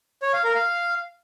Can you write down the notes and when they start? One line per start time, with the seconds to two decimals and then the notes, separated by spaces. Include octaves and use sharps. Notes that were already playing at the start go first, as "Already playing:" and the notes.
0.22 C#5
0.33 F5
0.44 A#4
0.55 F5